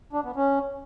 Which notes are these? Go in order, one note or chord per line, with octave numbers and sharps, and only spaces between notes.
D4
B3
C#4